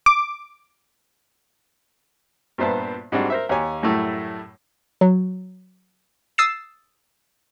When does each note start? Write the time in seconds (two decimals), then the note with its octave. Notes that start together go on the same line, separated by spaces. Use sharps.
0.06 D6
2.58 G2 A#2 B3 C5 E5 A5
3.12 G#2 G3 G#3 C4 D4 F#4
3.30 A#4 C5 E5
3.49 D#2 G4 C#5 G#5
3.83 F#2 A2 G3 A3 E4
5.01 F#3
6.38 D#6 E6 A6 C7 E7